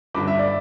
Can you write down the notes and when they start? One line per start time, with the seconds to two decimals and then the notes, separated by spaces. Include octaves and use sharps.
0.14 G1 G2 D3 B5 D6
0.27 E5
0.39 D5